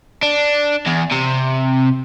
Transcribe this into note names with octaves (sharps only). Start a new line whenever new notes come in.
D4
E2
C3